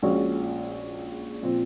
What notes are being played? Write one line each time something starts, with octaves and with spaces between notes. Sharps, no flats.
A#1 A#2 G#3 C#4 F#4
A#2 F3 C4